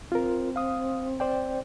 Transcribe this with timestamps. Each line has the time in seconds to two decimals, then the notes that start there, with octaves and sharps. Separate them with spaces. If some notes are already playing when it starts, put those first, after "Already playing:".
0.12 C4 F4 A#4
0.56 F5 D#6
1.20 C5 D5 G5